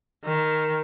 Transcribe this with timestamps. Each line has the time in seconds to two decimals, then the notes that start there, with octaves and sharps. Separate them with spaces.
0.24 D#3